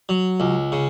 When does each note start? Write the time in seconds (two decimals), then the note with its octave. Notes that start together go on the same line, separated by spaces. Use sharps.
0.09 F#3
0.40 C#2
0.72 C#3